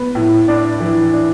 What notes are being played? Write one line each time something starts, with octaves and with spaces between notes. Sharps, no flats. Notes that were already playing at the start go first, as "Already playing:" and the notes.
Already playing: B3
A2
D4
E3
D4